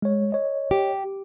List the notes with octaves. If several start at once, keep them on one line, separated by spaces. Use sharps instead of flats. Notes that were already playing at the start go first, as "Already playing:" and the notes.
G#3 C#5
C#5 D#5
G4